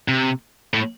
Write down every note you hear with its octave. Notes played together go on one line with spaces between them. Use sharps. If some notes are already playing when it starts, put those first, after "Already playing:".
C3
A2